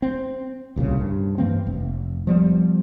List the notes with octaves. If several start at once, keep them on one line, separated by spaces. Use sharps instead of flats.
C4
D1 C2 A#2 C#3
G2
G2 E3 A#3 C4
F1
F3 G3 B3